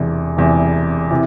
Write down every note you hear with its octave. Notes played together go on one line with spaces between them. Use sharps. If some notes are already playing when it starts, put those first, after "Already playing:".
Already playing: E1 E2 C3
E1 E2 C3
C3 E3